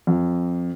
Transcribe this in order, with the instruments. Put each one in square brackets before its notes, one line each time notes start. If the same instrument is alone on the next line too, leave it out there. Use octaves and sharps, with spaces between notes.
[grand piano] F2